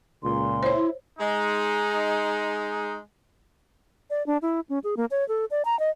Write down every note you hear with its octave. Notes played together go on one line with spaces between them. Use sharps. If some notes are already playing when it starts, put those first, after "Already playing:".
C#2 A#2 C6
E4 C5 C#5
G#3 D#4
D5
D4
E4
C#4
G#4
A#3
C#5
A4
D5
A#5
D#5